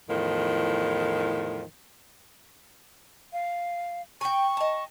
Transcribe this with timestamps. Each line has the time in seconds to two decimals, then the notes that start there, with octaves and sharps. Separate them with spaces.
0.09 E2 A2 D#3 F3
3.33 F5
4.21 G5 G#5 C#6
4.57 D#5 A5